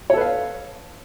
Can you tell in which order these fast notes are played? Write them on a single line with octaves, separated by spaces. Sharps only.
C#5 A4 B4 F5